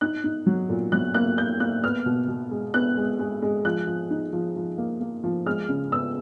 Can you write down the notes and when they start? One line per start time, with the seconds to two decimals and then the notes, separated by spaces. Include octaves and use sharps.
0.01 D#4 F#6
0.24 D#4
0.46 F#3
0.69 A#2
0.92 F#3 F#6
1.14 A#3 F#6
1.38 A#3 G6
1.60 A#3 F#6
1.83 B3 F6
2.06 B2
2.28 B2
2.51 G#3
2.74 B3 F#6
2.97 G#3
3.19 G#3
3.42 G#3
3.65 F3 F#6
3.87 F3
4.11 D#4
4.33 F3
4.56 F3
4.78 A#3
5.01 A#3
5.24 F3
5.46 G#3 F6
5.69 C#3
5.92 B3 E6